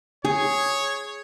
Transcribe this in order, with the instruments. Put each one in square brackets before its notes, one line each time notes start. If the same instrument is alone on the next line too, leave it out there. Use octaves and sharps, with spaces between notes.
[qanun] G#4 [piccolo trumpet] C#5